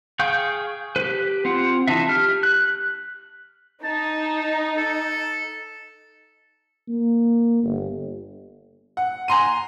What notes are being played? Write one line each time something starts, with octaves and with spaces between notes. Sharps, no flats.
G#4 F5 G5 C#6 G6
G4 B4
C4 F4 F#5
E3 D4 D#4 E5
G4 F6
F#6
D#4 A5
A4
A#3
G1
F#5
G#5 A#5 C6 D#7